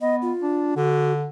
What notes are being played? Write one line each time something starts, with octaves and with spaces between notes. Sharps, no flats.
B3 D#5
F4
D4
D3 F#4